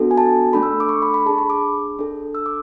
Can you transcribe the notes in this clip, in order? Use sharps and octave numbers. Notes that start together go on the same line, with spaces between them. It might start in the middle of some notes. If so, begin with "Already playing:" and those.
Already playing: B3 D4 F#4 A4
G#5
A5
A3 D4 A4 B5
E6
D6
C#6
B5
B5
D4 G#4 A5
B5
D6
D4 A4
E6
D6